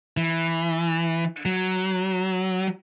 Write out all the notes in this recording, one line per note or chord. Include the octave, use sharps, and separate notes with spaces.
E3
F#3